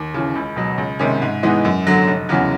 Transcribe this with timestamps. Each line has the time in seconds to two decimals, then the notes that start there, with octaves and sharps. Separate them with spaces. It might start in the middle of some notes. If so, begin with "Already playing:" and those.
Already playing: D#2
0.14 C#3 E3
0.35 C#2
0.56 B2 F#3
0.78 C#2
0.99 C3 D#3 G#3 C#4
1.22 G#2
1.43 E3 G#3 B3 D#4
1.65 F#2
1.87 D3 F#3
2.08 F1
2.29 E2 C#3 F#3